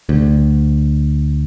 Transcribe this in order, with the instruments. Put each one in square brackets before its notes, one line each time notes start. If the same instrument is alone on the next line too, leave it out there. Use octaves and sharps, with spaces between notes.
[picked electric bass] D2